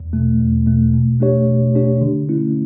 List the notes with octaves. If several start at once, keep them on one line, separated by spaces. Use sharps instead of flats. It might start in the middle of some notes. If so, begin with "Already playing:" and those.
Already playing: E2
B2 A3
E2
B2 A3
B2
A3 D4 G4 C#5
B2
A3 D4 G4 C#5
D3
A3 C#4 E4